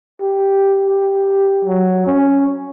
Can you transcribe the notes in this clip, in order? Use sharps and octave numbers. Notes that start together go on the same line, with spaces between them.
G4
G4
F#3
C#4